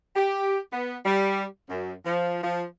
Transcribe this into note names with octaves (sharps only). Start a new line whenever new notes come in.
G4
B3
G3
F#2
F3
F3